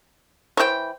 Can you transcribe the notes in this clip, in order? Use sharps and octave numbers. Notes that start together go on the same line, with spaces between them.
E3 C5 C#5 G5